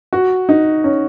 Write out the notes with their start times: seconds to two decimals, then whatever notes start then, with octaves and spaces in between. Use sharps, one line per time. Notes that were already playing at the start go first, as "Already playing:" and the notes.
0.13 F#4
0.49 D#4
0.84 C#4